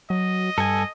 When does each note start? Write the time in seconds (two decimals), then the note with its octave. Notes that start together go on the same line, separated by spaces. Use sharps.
0.10 F#3 D#5
0.58 G2 A4 G#5